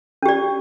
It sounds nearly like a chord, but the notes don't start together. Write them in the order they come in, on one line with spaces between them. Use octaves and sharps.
C#4 G4 D5